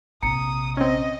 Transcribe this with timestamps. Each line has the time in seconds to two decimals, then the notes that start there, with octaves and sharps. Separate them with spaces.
0.23 A#1 C3 A#5 D#6 C#7
0.77 C4 C#4 D#5